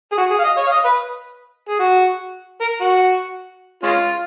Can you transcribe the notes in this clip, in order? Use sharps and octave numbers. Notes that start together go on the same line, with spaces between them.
G#4
F#4
G#4
F5
D#5
C#5
F5
D#5
B4
G#4
F#4
A#4
F#4
G#3 C#4 F4